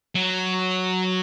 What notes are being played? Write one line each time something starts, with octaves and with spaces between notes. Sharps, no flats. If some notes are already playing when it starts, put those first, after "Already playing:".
F#3